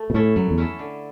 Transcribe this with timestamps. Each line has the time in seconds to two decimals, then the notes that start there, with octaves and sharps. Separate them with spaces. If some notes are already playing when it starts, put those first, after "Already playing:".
Already playing: A3
0.10 B2
0.14 A2 C#4 E4 A4
0.36 F#2 F#3
0.51 E2
0.58 C#4 E4 A4
0.79 D3